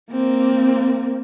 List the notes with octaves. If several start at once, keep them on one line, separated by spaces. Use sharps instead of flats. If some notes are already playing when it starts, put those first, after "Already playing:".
A#3 C4